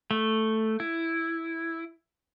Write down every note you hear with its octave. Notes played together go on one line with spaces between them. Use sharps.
A3
E4